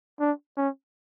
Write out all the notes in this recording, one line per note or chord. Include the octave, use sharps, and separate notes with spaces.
D4
C#4